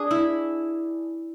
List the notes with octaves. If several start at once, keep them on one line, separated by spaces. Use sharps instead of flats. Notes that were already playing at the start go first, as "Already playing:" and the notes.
Already playing: D4 G#4
E4